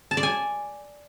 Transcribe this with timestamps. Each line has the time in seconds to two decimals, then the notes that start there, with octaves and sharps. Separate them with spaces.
0.11 A5
0.17 D5
0.23 G#5